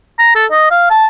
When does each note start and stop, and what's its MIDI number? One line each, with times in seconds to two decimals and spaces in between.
0.19 0.31 82
0.35 0.46 69
0.51 0.71 75
0.71 0.86 77
0.91 1.07 81